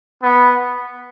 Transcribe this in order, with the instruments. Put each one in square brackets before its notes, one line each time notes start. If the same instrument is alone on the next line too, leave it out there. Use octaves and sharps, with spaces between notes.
[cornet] B3